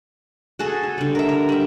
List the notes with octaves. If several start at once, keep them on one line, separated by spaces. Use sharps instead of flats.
F#4 G#4 A4
A4
D3 G3
A#4 E5
A#4
G3 E5